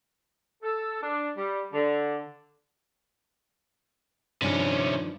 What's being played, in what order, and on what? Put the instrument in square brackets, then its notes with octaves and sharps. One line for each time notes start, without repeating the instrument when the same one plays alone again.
[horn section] A4
D4
G3
D3
[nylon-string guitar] G2 D#3 F3 [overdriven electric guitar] C3 C#4